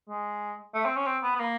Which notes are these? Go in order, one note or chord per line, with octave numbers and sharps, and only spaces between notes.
G#3
A3
C4
C#4
C4
B3
B3
A#3